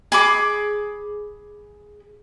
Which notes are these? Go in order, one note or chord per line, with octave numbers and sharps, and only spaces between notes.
G#4 B5 D6